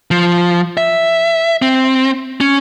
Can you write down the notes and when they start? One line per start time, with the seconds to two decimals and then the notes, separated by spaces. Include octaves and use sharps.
0.11 F3
0.77 E5
1.62 C4
2.41 C#4